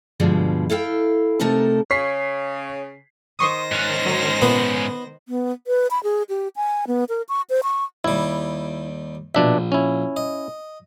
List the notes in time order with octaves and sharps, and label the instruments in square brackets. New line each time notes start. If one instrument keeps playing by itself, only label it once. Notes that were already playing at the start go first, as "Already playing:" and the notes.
[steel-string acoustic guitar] G2 B2 D3 F3 G3 G#3
E4 A4 F5 G5
C3 A3 D#4 A4 A#4 A5
[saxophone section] C#3 [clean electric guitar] C#5 [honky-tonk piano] B6 C7
[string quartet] D#3 C5 A#6 [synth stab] C6 C#6 D#6
[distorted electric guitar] G#2 C#4 [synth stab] F#6 A6
[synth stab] F#3
[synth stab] A#2 [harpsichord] B3
[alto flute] B3
B4
B5
G#4
G4
G#5
B3
A#4
C#6
C5
C#6
[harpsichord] D#2 G3 [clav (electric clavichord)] E4
[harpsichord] A#1 [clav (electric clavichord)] B2 D4 E5
[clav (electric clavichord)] C#4 E4
[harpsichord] D#5